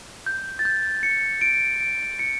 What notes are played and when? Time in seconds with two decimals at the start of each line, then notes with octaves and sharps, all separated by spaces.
0.26 G6
0.59 A6
0.65 G6
1.03 C#7
1.41 D7
1.80 D7
2.19 C#7